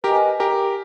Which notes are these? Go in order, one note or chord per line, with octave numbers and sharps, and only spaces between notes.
G4 A#4 B4 D#5 G#5
G4 A#4